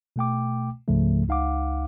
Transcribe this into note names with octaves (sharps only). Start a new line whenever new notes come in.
B2 A3 G5 D6
C#2 G#2 C#3 F3 A3
C#2 D#4 F5 F#5 D6